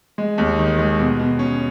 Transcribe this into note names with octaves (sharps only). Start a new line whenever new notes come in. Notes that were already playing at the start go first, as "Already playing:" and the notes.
G#3
D#2
D#3
G#3
B2
B2
C#4